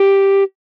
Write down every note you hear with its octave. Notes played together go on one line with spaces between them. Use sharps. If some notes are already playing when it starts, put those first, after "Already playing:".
Already playing: G4